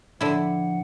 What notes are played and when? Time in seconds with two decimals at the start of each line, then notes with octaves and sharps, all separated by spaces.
0.21 A2 D3 F3 E4 F#5